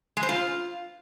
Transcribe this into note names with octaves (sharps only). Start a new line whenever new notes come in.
G#3
C5
F4